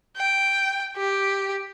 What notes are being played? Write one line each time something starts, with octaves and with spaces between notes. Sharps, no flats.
G5
G4